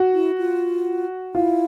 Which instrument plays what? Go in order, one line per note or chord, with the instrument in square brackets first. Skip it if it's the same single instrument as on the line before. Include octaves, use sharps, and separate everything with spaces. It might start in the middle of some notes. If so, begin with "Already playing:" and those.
Already playing: [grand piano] F#4
[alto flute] E4
F4
[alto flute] E4 [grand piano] F4